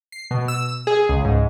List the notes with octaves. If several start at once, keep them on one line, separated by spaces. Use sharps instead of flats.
C7
B2
E6
G#4
C#2
G#2